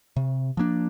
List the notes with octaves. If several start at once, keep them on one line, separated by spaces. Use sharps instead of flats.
C3
F3 A#3 D4